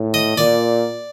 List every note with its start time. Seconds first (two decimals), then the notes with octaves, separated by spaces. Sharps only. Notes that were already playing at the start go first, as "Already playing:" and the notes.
Already playing: A2
0.14 D#5
0.37 A#2 D5